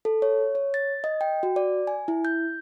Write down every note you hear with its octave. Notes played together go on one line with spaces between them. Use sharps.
A4
C#5
C#5
A6
D#5
G5
F#4
D5
G#5
E4
G6